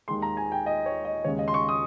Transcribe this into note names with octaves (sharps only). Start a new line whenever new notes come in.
D#2 D#3 G#3 C6
A#5
G#5
G5
D#5
C#5
D#5
D#2 C#3 G#3 C#5
D#5
C6
C#6
D#6